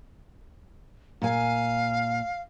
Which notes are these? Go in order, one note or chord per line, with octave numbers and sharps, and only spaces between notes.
A#2 F5 G#5